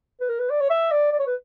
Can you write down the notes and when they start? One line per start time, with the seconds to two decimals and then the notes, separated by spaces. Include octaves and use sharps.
0.20 B4
0.29 A#4
0.39 B4
0.50 D5
0.61 C#5
0.70 E5
0.91 D5
1.12 D5
1.19 C#5
1.27 B4